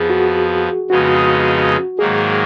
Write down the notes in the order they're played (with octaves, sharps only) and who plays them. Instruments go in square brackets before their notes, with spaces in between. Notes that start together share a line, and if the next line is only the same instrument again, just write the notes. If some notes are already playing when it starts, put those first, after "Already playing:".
Already playing: [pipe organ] F2 F3 B3 [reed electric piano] G#4
[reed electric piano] F#4
[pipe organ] F2 C#3 G#3 B3 D#4 [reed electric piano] F#4
[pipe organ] G#2 D#3 F#3 A#3 [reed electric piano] G#4